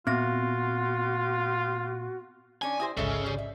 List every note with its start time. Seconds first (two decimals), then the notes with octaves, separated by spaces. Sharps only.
0.07 A#2 B3 C4 F4 F#4 A#6
2.62 D#3 C#4 D4 G#5
2.80 E4 G4 C5 D#6 A#6
2.97 A1 D2 G#2 C#3 A4 D#5 E5
3.26 G3
3.38 E5